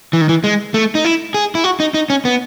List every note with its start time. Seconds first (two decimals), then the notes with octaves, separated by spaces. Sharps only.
0.13 E3
0.21 D#3
0.29 E3
0.44 G#3
0.74 A3
0.95 D#4
1.05 E4
1.34 G#4
1.55 E4
1.64 F#4
1.80 D#4
1.94 D#4
2.10 C#4
2.25 B3